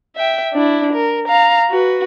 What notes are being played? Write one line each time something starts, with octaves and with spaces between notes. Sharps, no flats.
E5 G5
D4 E4
A#4
F5 A#5
F#4 B4